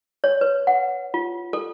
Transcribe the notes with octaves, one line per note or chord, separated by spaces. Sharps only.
C#5
B4
F#5
F4
A4